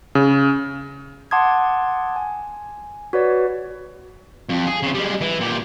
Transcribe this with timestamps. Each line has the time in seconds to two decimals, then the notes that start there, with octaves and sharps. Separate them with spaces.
0.15 C#3
1.31 F#5 A5 C6 D6 D#6 G#6
2.16 G#5
3.13 F#4 B4 C#5 D5
4.49 F2
4.67 G#4
4.83 C#3 C4
4.94 G3 G#3
5.21 E3
5.40 A#2 G4